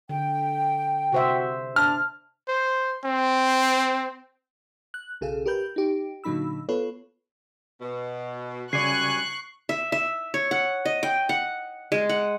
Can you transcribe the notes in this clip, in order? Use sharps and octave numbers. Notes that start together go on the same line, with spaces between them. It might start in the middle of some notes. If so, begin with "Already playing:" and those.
D3 G5
C3 F#4 C5 E5
D4 F6
C5
C4
F#6
B1 C#3 G#4 A4 F5
G4 A#4 B4 G6
D#4 G4
A#2 D3 F#3 D#4 B5 E6
B3 F4 A4 B4 C#5
B2
F#2 C#3 G3 D5 G#5 C#6 F#6 C7
E5
E5
C#5
F#5
D#5
G5
F#5
G#3
F#5